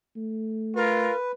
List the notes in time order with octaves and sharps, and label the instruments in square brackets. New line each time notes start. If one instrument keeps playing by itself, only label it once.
[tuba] A3
[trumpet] F4 [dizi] A#4 [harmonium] B4